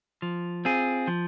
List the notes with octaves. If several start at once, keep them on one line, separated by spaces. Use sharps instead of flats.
F3
C4 F4 G#4
F3